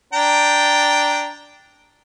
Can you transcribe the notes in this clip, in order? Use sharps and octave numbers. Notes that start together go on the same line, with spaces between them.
D4 G5 A#5